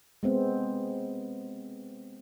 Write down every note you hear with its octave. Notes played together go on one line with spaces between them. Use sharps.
G#3 B3 C4